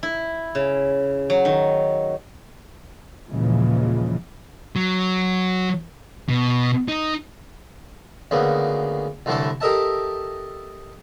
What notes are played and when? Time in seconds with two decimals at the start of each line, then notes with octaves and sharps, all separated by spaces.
0.03 E4
0.55 C#3
1.30 F#3
1.45 D#3
3.28 D#2 A#2 C#3 E3 F3 G#3
4.76 F#3
6.29 B2
6.88 D#4
8.31 D2 C#3 A#3 B3
9.26 C2 A2 D3 E3 A3 A5
9.61 G4 A4 A#4 D#5 E5 A5